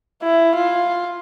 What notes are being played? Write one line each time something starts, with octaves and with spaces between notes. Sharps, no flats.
E4
F4